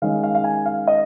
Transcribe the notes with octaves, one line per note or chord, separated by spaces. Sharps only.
D#3 G#3 C#4 F5
F5
F5
G#5
F5
D#5